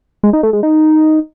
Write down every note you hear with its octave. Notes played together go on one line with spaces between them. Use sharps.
G#3
D#4
A3
G#3
D#4